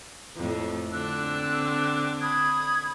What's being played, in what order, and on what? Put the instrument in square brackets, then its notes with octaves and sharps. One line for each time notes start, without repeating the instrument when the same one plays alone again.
[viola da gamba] F2 A2
[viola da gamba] D3 C4 D4 [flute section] E6 F#6
[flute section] B5 D#6 G#6